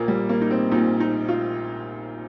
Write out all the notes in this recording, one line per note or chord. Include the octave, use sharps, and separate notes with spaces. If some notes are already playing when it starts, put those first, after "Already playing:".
Already playing: A#1 A#2 A#3
G3
A#3
D#4
C4
A#1 A#2 D#4
D#4
F4